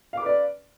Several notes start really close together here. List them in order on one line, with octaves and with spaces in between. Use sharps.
F5 D6 B4 D5